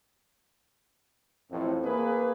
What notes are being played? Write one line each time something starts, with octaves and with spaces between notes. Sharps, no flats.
A1 F2 A2 C4
A#3 G#4 B4